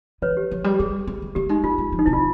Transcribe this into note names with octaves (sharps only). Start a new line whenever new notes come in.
E3 B4 C#5
G4
F3
G3
G4
G3 G#4
A3
G#3
A3 G4
G#3 D#4
G#3 F4
G#3
F3
D#4
C3 E4
F4